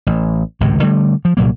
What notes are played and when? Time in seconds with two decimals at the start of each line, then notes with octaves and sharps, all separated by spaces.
0.07 A1
0.61 G#1 C#2 A2 C3
0.82 D3 G3 A3
1.25 F3
1.37 C2 A#2 F#3 A#3